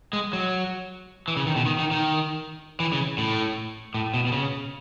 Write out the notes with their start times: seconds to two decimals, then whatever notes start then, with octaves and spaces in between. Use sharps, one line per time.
0.13 G#3
0.33 F#3
1.28 E3
1.37 C#3
1.47 D#3
1.56 B2
1.66 D#3
1.79 D#3
1.91 D#3
2.80 E3
2.93 C#3
3.18 A2
3.94 A2
4.14 B2
4.27 B2
4.32 C#3